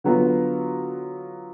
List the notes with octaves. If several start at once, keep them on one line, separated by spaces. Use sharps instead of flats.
D3 F#3 B3 F4